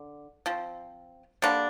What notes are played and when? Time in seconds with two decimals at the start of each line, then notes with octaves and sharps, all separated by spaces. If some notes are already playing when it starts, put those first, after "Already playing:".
Already playing: D3
0.46 F3 C4
1.42 D3 G3 A#3 D4